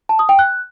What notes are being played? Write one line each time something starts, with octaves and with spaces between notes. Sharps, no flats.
A5
D#6
G5
F#6